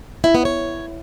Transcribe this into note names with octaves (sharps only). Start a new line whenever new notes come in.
E4
B3
C#5